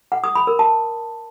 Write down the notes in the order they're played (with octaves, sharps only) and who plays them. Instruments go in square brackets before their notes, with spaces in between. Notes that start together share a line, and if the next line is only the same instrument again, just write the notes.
[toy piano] F#5
D#6
B5
A#4
A5